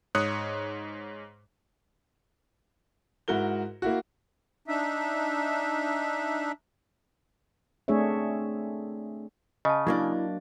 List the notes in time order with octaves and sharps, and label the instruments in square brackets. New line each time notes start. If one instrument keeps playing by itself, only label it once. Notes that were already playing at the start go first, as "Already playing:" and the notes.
[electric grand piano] G#2 C#5 D#6 F#6 C#7
[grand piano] G#2 E4 F#4 A#4 G7
A#3 E4 F#4
[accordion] D4 D#4 E5
[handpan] A3 C4 D4 G#4 C#5 E5
[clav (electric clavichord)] C#3 [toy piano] D#5 A5
[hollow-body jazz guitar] F#3 A#3 D4 [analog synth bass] E4